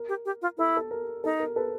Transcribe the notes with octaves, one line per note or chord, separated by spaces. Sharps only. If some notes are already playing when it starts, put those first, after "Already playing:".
Already playing: A#4
G4
G4
F4
E4 A4
A4
A#4
D#4 A4
A#4
A4 B4